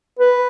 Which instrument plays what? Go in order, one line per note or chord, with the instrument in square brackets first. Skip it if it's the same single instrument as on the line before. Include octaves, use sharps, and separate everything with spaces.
[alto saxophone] B4